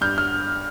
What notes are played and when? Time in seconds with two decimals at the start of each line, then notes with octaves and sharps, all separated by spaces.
0.01 G2 F6 G6
0.18 F6